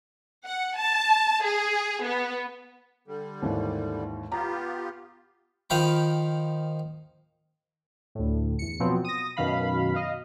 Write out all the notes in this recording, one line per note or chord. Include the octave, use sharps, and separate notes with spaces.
F#5
A5
G#4
B3
D3 G3
D#2 G#2 E3
B3 F4 G4 A#5
D#3 F3 F5 G5 B5
D2 A2
E2 C#7
B2 F3 F#3 B3 C4
D#6 A#6
F#2 B2 D#3 F5 B5
D#5 F5